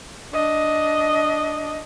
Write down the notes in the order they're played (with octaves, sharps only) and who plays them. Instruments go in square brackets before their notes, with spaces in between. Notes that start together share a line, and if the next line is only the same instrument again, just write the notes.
[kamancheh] D4 D#5